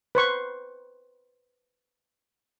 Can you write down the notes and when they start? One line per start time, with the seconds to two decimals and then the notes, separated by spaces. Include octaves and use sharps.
0.15 B4 C5 C#6